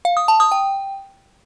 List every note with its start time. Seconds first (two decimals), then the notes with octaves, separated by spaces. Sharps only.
0.05 F5
0.17 D#6
0.28 A5
0.40 D#6
0.52 G5